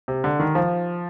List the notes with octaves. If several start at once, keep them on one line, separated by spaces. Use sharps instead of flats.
C3
D3
D#3
F3